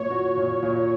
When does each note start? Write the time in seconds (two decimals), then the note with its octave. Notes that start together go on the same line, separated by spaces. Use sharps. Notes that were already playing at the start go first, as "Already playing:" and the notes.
Already playing: A#2 F#3 F#4 C#5
0.11 F#4
0.37 A#2
0.63 A#2